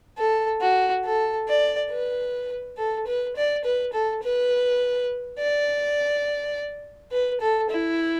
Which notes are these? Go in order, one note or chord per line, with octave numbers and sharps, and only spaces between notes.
A4
F#4
A4
D5
B4
A4
B4
D5
B4
A4
B4
D5
B4
A4
E4